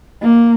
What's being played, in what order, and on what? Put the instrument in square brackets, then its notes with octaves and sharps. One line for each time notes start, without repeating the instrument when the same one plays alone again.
[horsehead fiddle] A#3